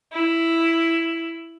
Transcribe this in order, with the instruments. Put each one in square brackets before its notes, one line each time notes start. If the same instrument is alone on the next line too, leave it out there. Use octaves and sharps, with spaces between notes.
[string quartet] E4